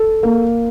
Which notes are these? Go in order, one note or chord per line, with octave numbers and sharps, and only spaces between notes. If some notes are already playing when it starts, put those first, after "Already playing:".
Already playing: A4
A#3